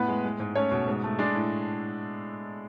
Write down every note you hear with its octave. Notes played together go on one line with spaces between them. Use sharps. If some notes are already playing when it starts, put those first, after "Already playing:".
Already playing: A2 B3 B4
G#3
G#3
G#2
A3 C#4 C#5
B2
G#2
A3
G#3 D4 D5
A2